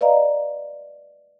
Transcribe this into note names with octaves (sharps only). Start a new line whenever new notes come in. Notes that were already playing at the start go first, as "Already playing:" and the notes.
B4 D5 D#5 F5 A#5